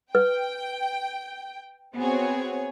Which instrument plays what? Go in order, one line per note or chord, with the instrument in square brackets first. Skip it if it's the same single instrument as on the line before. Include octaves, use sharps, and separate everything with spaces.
[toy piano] B4 [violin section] G5
[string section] B3 G#4 C#5 [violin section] C4 F#4